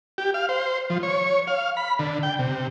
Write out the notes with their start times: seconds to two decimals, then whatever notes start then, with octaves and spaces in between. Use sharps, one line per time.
0.18 G4
0.34 F5
0.49 C5
0.90 F3
1.03 C#5
1.47 F5
1.77 B5
1.99 D3
2.23 G5
2.39 C3